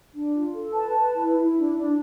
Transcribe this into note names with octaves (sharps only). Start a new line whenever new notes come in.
D4
F4
A4
B4 A5
B4
E4
E4
D4
D4